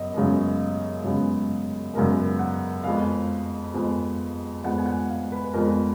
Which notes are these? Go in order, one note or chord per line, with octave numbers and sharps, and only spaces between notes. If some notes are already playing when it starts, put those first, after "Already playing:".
Already playing: F#2 B3 D#5
F#2 C#3 G#3 B3
F#2 C#3 G#3 B3
F#2 C#3 G#3 B3 A#4
F#5
F2 F3 G#3 B3 F5
F2 F3 G#3 B3
F2 F3 G#3 B3 F#5
G#5
F#5
F5
B4
F2 F3 G#3 B3 A#4